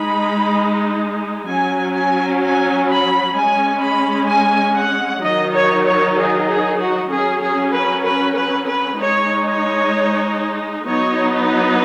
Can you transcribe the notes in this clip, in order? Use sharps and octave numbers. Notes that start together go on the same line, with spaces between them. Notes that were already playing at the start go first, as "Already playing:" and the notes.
Already playing: G#3 D#4 B5
F#3 C#4 G#5
G#5
G#5
B5
G#3 C#4 G#5
B5
G#5
F#5
D#3 F#3 D#4 D#5
C#5
C#5
G#4
G#4
F#4
F#3 C#4 G#4
G#4
B4
B4
B4
B4
G#3 D#4 C#5
C#5
F#3 B3 D#4 C#5
B4